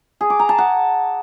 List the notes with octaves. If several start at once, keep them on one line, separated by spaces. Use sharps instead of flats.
G#4
D6
A#5
A5
F#5